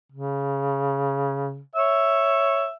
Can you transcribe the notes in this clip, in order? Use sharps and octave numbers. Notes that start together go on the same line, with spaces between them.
C#3
C#5 E5